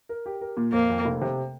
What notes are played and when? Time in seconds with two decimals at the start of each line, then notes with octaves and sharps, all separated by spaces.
0.09 A#4
0.26 G4
0.41 A#4
0.57 A#2
0.72 F2 A#3
0.90 F2
1.05 F1
1.21 C3